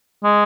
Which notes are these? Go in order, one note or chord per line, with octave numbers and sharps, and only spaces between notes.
G#3